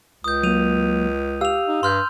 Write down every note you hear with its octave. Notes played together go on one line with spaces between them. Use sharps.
C#2 D#6 G6
F#3 A#3 D#7 F7
G4 F5 E6 F7
D#4
G2 C6 F6 G6